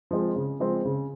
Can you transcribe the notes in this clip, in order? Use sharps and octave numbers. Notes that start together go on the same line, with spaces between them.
F3 G#3 C4
C#3
F3 G#3 C4
C#3